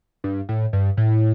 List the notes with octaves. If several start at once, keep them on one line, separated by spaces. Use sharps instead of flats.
G2
A2
G2
A2